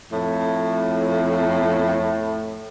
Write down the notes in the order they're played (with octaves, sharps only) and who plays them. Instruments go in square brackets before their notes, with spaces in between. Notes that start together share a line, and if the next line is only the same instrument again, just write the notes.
[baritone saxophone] F2 [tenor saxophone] A2